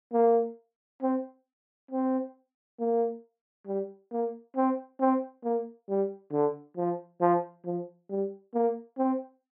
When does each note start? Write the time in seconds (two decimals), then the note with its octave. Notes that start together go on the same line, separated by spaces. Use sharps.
0.13 A#3
1.02 C4
1.91 C4
2.80 A#3
3.67 G3
4.12 A#3
4.56 C4
5.00 C4
5.44 A#3
5.89 G3
6.32 D3
6.77 F3
7.21 F3
7.65 F3
8.10 G3
8.54 A#3
8.98 C4